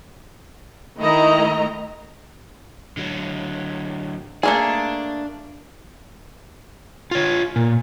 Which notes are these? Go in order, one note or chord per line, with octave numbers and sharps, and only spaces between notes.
D#3 A3 E4 D#5 A#5
D3 F#3
A3 A#3 D4 G#4
F4 C#5
A#2